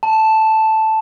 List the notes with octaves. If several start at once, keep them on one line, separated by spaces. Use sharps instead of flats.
A5